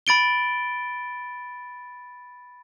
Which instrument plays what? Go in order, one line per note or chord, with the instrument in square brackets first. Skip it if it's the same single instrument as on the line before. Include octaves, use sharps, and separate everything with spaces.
[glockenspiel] B5 A6 D7 G7